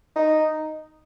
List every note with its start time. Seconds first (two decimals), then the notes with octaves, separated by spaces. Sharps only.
0.16 D#4